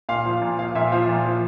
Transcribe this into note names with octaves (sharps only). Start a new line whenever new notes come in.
A#2 F5
F3
A#2
F3 F5
A#2 E5
F3 F5
A#2
F3